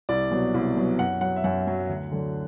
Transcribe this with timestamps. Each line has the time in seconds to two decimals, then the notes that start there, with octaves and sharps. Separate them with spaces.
0.09 C2 D5
0.31 B2 F#3
0.54 C2
0.77 B2 F#3
0.99 F#2 F#5
1.21 F#3 F#5
1.36 E5
1.44 F#2 F#5
1.67 F#3
1.89 D2
2.12 D3 F#3